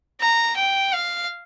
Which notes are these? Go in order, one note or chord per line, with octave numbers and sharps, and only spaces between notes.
A#5
G5
F5